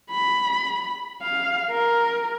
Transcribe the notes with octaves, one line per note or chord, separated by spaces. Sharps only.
B5
F5
A#4